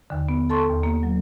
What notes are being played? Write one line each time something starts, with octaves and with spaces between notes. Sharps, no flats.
D#2 D3
B3
A4 A5 C6 C#6
D#2
A#3
F#3